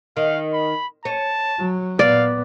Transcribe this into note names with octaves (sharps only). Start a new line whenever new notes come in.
D#3 F5
B5
C#4 A5
F#3
A#2 B3 D5 F5